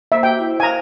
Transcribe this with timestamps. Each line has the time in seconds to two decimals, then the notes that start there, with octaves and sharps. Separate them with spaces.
0.12 A#3 C5 E5
0.23 F#4 G5
0.39 E4 C5
0.60 C5 F5 G#5 A#5